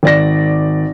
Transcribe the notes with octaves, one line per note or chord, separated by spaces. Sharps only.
G#1 D5 A#6